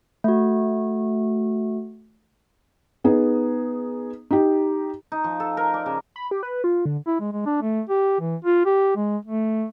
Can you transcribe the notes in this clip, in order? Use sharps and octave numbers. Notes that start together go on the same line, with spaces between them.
A3 F#4
B3 D#4 G#4
D#4 G4
D#4
F3
A4
A#4
D5
C#3
B5
G4
B4
F4
D3
E4
G#3
G#3
D4
A3
G4
E3
F4
G4
G#3
A3